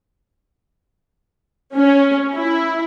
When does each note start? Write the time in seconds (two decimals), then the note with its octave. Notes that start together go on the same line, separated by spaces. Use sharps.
1.75 C#4
2.34 E4